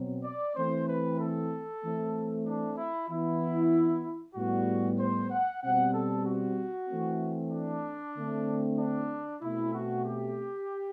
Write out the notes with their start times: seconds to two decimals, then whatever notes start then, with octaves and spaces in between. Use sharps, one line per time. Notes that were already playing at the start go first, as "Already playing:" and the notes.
Already playing: B2 F#3 C4
0.24 D5
0.56 E3 A3 C4 C5
0.88 B4
1.20 A4
1.82 E3 A3 C4
2.45 D4
2.77 E4
3.09 E3 B3 E4
4.35 A2 G3 B3 F#4
4.99 C5
5.31 F#5
5.63 B2 G3 C4 F#5
5.94 A4
6.26 F#4
6.89 E3 A3 C4
7.52 D4
8.16 D3 A3 C4
8.79 D4
9.42 B2 A3 C4 E4
9.74 F#4
10.05 G4